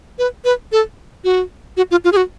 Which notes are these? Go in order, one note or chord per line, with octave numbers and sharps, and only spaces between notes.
B4
B4
A4
F#4
F#4
F4
F4
G#4
F#4